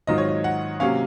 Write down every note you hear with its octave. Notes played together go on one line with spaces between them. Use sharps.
G#2 D#3 F#3 C4 F4 D#5
C#5
D#5
F#5
C3 F#3 A#3 C#4 F5